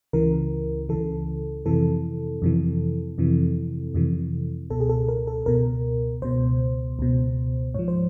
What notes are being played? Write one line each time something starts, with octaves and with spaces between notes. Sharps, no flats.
C#2 C#3 E3 A#4
C#2 C#3 E3 A4
F2 C3 E3 A4
F2 C3 E3
F2 C3 E3
F2 C3 E3
C#2 B2 A4
G#4
A4
A#4
A4
C#2 B2 A#4
C#2 B2 C5
C#2 B2
G#2 F3 C#5
C5